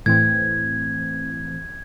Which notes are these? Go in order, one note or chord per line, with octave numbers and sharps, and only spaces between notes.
A2 E3 C4 G#6